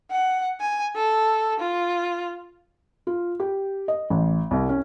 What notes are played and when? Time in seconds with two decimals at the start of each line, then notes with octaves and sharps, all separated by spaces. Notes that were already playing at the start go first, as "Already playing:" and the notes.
0.11 F#5
0.61 G#5
0.95 A4
1.60 F4
3.07 F4
3.40 G4
3.88 D#5
4.10 A1
4.51 C2
4.69 C#4